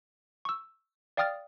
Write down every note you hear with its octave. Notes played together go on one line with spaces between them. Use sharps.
C#6 E6
D5 F5 G5 D#6 F6 A6